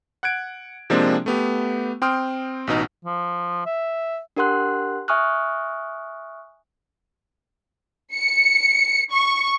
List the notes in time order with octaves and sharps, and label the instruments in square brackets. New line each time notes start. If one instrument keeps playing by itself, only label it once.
[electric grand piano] F#5 F#6 G#6 D7
C3 F3 G#3 A#3 C4 D4
A3 B3 G4
C4 G5 C6 D#6 F6
A1 B2 D#4
[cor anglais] F3
E5
[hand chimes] D4 G4 A#4 F#5 C6 F#6
E5 G#5 C#6 D#6 F6 F#6
[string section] C#7
C#6